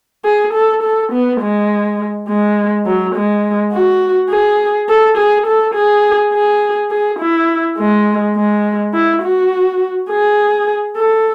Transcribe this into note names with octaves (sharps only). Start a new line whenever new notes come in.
G#4
A4
A4
B3
G#3
G#3
F#3
G#3
F#4
G#4
A4
G#4
A4
G#4
G#4
G#4
E4
G#3
G#3
E4
F#4
G#4
A4